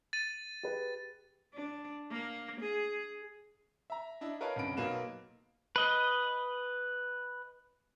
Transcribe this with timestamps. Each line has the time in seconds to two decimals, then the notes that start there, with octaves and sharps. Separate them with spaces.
0.13 A6 D#7
0.63 G4 G#4 B4
1.54 D4
2.10 A#3
2.61 G#4
3.90 E5 A#5
4.21 D4 E4 D#5
4.41 A#4 B4 C#5 D#5 F5 A5
4.56 C2 F#2 D3 B5 D7
4.77 B1 F#3 A#3 D#4 B4 E7
5.76 B4 D#5